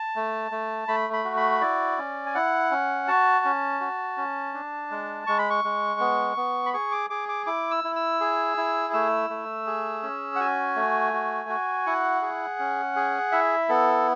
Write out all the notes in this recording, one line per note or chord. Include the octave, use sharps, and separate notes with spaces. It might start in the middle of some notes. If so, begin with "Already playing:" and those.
Already playing: A5
A3
A3
A3 B5
B5
F#4
B5
E4 D5
C#4
G#5
E4 F#5
C#4
F#4 A5
C#4
F#4
C#4
D4
G#3
G#3 C#6
B5
C#6
G#3
B3
B3
B5
G#4 C#6
D6
G#4 D6
D6
E4 D6
E6
E4
E6
G#4
E4
A3 E6
A3
G#4
C#4
F#5
F#4 G#5
A3
F#4
F#4
E4 F#5
G#4
C#4
G#4
E4 E5
B3 A4